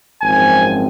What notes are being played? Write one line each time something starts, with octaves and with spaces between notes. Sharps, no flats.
G#1 F#2 F3 C4 G#5